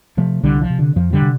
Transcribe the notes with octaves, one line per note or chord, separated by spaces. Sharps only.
C3 F3 A3
C2 D3 G3
F3
C3
D3
F2 F3
D3 G3
C3